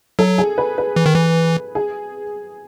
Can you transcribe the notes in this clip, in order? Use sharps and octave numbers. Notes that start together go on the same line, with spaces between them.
F#3 A4
G#4
B4
B4
E3
D#3
E3
G#4